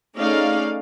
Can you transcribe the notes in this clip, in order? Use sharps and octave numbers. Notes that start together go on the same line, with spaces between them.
A3 C#4 D#4 G#4 D5 F5